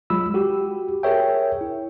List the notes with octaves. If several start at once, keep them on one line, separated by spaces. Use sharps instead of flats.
F#3 G#3 F4 B5 E6
F#4 G4
G#4 A#4 C#5 E5 G5
E4